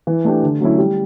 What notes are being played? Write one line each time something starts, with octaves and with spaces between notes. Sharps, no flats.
E3
A3 D4 G4
D3
F#3 A3 C#4 E4
G3